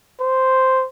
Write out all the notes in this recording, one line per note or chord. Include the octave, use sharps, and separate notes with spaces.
C5